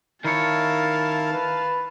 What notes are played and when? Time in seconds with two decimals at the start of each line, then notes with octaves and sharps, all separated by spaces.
0.24 D#3 E4 A#4 C#5 F5 A5
1.32 B4